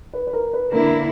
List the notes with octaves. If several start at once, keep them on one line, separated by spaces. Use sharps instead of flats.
B4
B4
A#4
B4
D3 A#3 E4 A#4